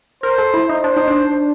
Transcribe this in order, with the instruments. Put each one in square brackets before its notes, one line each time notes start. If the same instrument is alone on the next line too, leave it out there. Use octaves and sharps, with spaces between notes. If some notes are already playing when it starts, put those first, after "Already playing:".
[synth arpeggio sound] A#4 [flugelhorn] C5
[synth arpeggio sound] A4
E4
D#4
[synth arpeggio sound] D4 [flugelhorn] C5
[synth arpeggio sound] D#4
D4